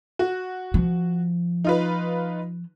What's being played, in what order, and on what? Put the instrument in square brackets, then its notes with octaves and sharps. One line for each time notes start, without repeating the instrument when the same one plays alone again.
[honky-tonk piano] F#4
[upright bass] F3
[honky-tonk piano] D#4 F4 B4